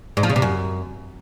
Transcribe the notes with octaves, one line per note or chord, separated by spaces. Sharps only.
G#2
F3
C#3
C3
F#2